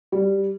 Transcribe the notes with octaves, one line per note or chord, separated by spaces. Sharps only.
G3